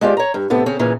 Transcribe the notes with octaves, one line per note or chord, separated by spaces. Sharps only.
G#3 F4 G4 C5 D5
C#5 A#5
G2
A2 C3 B3 A4
C#3 C4 C#4
A#2 C#3 E3 C#4